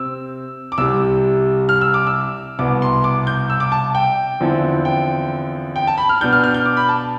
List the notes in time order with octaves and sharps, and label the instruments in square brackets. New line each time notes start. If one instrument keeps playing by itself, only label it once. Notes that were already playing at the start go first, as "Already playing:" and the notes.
Already playing: [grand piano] C3 C4 E6
D6
C2 C3 G3 E6
F6
E6
D6
E6
C2 B2 B3 D6
C6
D6
G6
E6
D6
A5
G5
E2 D3 F3 C4 E4
G5
G5
A5
B5
F6
B2 B3 D4 G6
F6
F6
G6
D6
B5
A5